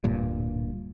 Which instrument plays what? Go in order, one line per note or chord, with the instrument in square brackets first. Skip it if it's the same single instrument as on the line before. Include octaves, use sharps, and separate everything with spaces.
[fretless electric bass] D1 G2 A#2